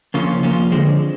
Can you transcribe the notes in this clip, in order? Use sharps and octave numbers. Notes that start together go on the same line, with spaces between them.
C#3 F3 A#3 C#4 F4
C#3 F3 A#3 C#4 F4
D2 D3 F3 G#3 C4